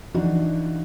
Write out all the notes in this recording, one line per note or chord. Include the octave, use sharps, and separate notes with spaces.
E3 F3 D4 D#4 F#4